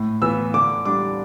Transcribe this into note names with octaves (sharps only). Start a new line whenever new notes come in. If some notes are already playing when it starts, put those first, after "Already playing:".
Already playing: A2
E3 B3 E4 E6
D3 D6
G3 D4 D6